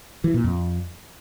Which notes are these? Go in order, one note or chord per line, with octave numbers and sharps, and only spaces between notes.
E3
A#2
F2